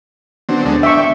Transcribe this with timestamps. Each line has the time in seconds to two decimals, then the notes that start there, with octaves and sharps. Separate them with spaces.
0.49 D3 F#3 B3 C4 D4
0.65 D2 D3 G#3
0.83 D5 E5 G5 C#6